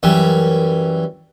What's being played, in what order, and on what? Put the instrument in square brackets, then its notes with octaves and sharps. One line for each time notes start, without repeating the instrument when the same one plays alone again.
[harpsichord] F#2 E3 G3